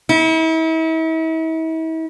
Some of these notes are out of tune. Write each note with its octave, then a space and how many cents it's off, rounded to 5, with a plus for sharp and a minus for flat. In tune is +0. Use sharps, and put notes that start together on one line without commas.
E4 -40